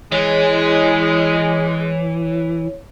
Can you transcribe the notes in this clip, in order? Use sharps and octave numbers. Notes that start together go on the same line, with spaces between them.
E3 G#3 E4 C#5